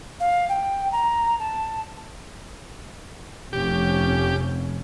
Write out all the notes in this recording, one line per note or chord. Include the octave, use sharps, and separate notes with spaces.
F5
G5
A#5
A5
F1 C3 C#4 G4